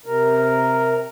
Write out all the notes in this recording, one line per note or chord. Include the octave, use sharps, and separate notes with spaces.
C3 A#4